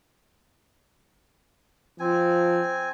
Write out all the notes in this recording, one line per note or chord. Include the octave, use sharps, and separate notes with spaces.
F3 C4 G#5